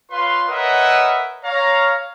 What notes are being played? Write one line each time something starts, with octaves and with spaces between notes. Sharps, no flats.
F4 B4 C#5 F5 C6
A#4 B4 C#5 D#5 E5 F#5
C#5 F5 A#5